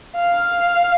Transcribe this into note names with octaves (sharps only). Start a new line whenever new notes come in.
F5